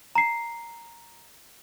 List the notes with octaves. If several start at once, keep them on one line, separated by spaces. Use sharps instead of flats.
A#5 C7